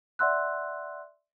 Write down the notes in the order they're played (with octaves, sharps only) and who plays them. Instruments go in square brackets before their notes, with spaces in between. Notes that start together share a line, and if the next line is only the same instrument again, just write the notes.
[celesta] D5 E5 F#5 C6 E6 F#6